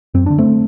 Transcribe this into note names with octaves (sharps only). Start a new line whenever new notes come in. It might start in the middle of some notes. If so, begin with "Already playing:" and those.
F#2 C4
D3 D4
A3 C4